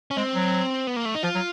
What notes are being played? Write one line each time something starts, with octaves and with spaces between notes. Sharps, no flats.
C#4
G#3 C4
F#3
B3
A#3
A3
D#4
F3 F4
F#3